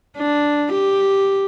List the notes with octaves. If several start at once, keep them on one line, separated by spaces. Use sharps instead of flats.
D4
G4